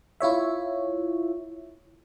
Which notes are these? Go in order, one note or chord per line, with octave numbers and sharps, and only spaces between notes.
E4 F4 C#5 E5